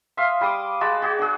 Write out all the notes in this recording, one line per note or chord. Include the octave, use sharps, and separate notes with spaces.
E5 F5 C6 D#6
G3 C6 D6 D#6
G#3 F#4 A5 B5
F#4 G#4
D4 G#4